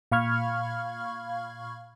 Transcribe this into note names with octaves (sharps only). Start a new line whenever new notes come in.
A#2 F5 B5 C#6 F6 G#6